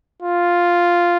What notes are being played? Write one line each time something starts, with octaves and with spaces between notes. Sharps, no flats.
F4